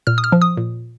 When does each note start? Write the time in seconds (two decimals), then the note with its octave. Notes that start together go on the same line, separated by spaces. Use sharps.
0.07 A#2 F6
0.18 D#6
0.24 F6
0.32 F3
0.42 D#6
0.57 A#2